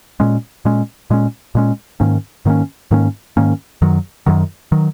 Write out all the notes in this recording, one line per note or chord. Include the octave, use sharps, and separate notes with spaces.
A#2 G#3 C#4
A#2 G#3 C#4
A#2 G#3 C#4
A#2 G#3 C#4
G#2 D#3 A#3 C#4
G#2 D#3 A#3 C#4
G#2 D#3 A#3 C#4
G#2 D#3 A#3 C#4
F#2 D#3 F#3
F#2 D#3 F#3
D#3 F#3